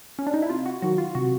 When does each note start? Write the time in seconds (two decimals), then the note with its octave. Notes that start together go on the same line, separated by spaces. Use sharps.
0.19 C#4
0.27 D4
0.34 D#4
0.42 E4
0.50 C3 F4
0.66 F#4
0.82 D#3 F#3 F#4
0.98 F4
1.15 C3 F#4